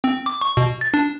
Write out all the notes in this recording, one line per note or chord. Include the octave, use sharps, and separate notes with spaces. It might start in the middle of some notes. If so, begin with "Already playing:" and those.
C4
D6
C#6
B2
A6
D4